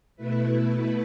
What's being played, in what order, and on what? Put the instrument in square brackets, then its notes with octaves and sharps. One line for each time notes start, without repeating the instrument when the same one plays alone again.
[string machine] B2 A3 E4 B4